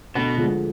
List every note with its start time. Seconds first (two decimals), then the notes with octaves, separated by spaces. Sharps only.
0.15 D2 B2 B3
0.37 D3 F3 G#3